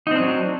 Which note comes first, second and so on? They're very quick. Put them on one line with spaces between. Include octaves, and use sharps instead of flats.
D#4 C4 D4 F#3